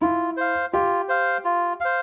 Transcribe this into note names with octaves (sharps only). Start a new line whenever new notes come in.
E4 F4
C5 F5
F4 G4
C5 F5
F4
C5 F5